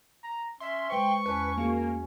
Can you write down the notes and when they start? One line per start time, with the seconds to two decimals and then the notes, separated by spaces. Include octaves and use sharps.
0.24 A#5
0.60 C#4 E5 C6
0.90 G#3 B4 C5 G5 C#6
1.26 E2 C#4 B4 A5
1.57 A#3 F#4 G#4 F5